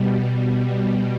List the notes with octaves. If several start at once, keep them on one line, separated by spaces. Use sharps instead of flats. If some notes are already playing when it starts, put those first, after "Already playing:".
Already playing: B2 G3